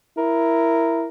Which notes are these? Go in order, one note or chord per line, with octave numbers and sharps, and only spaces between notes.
E4 A#4